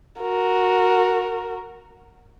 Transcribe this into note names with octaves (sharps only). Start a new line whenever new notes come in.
F#4 A#4